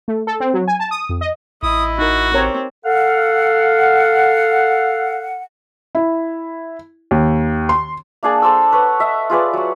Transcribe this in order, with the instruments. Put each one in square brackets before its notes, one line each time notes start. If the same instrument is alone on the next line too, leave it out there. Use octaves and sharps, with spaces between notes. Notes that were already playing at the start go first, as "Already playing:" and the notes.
[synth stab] A3
A4
C4
F#3
G#5
A5
D#6
F2
D#5
[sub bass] A1 [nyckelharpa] E4 D#5 [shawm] D#6
[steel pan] D#4 A#4 [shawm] F#4
[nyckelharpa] C4 G4 [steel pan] A#4 C#5 A#5
[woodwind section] A4 F5 F#5
[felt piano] E4
D#2
C6
[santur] A#3 D4 G#4 D5
A4 C5 D6 E6
B4 C#5 F#5
D#5 E5
F4 G#4 B4 D5
F#3 F#4